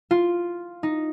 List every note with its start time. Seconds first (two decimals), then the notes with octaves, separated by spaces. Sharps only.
0.11 F4
0.83 D#4